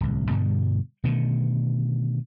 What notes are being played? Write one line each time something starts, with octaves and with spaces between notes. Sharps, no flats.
D1 C2
G2 B2 D3 G3
B2 D3 D#3 A3